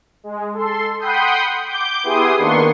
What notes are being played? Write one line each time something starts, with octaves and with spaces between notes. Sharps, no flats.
G#3
A4 C6
F#5 G5 B5 C6 D#6 G6
D6 G6
B3 E4 G4 G#4 C6 D#6
D#3 A#3 B3 D4 C6 C#6